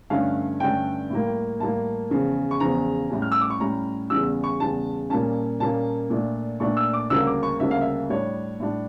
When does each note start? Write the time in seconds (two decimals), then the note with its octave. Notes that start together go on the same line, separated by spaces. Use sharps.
0.10 G2 D3 A3 C#4 F5
0.60 G2 D3 A3 C#4 G5
1.10 A2 G3 A#3
1.60 A2 G3 A#3 A5
2.10 E2 C#3 F3
2.51 C#6
2.60 E2 C#3 F3 A#5
3.10 A2 G3 C#4
3.22 F6
3.32 E6
3.41 D6
3.50 C#6
3.60 A2 G3 C#4 A#5
4.10 E2 C#3 G3 E6
4.44 C#6
4.60 E2 C#3 G3 A5
5.10 A#2 G3 A#3 C#4 A5
5.60 A#2 G3 A#3 C#4 A5
6.10 A#2 A3 D4
6.60 A#2 A3 D4 C#6
6.77 E6
6.93 D6
7.10 D2 C#3 G3 A#3 C#4 E6
7.27 D6
7.43 C#6
7.60 D2 C#3 G3 A#3 C#4 E5
7.71 F5
7.81 E5
8.10 A2 G3 D4 C#5
8.60 A2 G3 D4